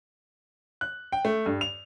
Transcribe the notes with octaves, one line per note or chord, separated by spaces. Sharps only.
F#6
G5
A3
G2
F7